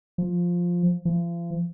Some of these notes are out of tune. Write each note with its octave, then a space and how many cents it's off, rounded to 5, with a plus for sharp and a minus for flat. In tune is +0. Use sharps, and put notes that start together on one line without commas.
F3 +5
F3 -40